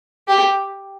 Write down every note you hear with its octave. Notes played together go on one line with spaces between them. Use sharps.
G4